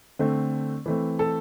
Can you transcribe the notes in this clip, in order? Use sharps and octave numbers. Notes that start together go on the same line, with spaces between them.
D3 A3 C4
E3 A3 C4
A4